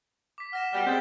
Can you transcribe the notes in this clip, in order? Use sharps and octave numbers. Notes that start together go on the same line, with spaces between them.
D6 B6
F#5 F6 A#6 E7
B2 G3 F6 G7
G#3 C4 G#4 G5 G6 A6